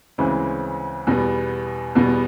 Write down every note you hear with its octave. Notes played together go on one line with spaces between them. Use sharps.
D2 C#3 E3 G#3 C4
E2 B2 G3 B3
E2 B2 G3 B3